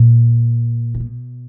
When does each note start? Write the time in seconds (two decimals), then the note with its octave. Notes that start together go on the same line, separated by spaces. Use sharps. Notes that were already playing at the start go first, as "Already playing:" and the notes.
Already playing: A#2
0.94 C3
1.00 B2